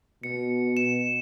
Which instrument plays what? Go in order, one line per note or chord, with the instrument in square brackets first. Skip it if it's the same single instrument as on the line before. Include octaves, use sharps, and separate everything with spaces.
[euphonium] B2 [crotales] C#7
[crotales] E7